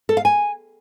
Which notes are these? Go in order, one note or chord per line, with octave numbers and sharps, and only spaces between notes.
A4
F5
G#5